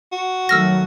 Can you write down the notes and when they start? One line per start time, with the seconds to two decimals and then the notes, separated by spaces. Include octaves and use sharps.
0.12 F#4
0.49 D#3 F#3 A3 E6 F6 A#6